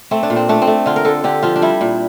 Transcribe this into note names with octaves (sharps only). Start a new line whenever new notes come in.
A3 C4
D4
A#2
C4
A3 D4
C4
A3
D3 F4
A#4
D3 A4
D3 G4
F3 F4
D4
G3 E4
A#2